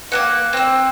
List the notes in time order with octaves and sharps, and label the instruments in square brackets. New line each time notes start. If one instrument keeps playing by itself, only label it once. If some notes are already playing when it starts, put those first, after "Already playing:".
[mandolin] A#3 C4 F#5
C4 E6